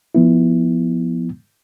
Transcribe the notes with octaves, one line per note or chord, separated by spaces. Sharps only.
F3 B3 E4